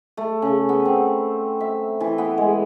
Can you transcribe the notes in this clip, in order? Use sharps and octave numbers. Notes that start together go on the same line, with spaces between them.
A3
C#3
B3
C4
E5
E3
B3
G#3